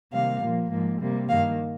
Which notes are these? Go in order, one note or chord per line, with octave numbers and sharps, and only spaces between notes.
C3 D#3 G3 A#3 F5
A#2 F3 A#3
G#2 F3 A#3
C3 G3 A#3
G2 D#3 A#3 F5